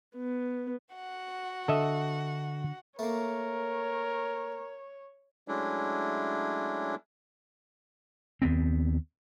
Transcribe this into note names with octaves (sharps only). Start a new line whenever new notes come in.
B3
F#4 F#5
D3 A4 D#5 E5
A3 A#3 A#4 C#5
F#3 G#3 A3 C#4 D4 E4
D#2 B3 C4